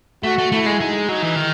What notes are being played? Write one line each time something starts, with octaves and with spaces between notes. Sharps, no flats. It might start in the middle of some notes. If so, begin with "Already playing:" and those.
A3 F#4
A3
A3 E4
G#3
G#3 D#4
F#3 D#4
E3
D#3